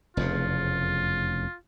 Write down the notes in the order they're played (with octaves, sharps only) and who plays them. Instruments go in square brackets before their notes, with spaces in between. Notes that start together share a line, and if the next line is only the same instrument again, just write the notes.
[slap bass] F1 E2 C#3 [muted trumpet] F4